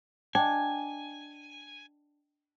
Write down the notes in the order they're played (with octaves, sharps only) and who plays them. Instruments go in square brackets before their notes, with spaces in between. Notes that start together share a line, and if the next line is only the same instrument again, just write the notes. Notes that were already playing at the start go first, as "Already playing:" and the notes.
[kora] D4 [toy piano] D#5 G5 [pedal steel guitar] G#5